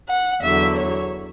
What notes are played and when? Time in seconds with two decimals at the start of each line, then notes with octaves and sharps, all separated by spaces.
0.09 F#5
0.42 E2 D3 F#3 E5
0.77 C#5